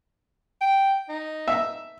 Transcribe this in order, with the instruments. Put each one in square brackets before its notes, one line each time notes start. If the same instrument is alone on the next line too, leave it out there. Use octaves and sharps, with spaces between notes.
[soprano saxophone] G5
D#4
[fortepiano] E5